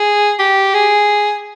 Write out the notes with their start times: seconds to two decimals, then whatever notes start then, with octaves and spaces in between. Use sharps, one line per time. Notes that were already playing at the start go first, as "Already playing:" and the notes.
Already playing: G#4
0.39 G4
0.74 G#4